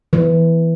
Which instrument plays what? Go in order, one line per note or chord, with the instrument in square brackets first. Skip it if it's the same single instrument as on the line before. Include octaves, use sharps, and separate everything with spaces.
[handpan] E3